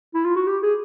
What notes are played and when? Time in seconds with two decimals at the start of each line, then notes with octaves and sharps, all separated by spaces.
0.14 E4
0.25 F4
0.36 F#4
0.47 G4
0.63 G#4